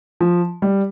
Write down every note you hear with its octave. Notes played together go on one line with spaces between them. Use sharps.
F3
G3